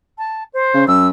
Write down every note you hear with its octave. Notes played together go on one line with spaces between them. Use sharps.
A5
C5
C#3
F#2 E6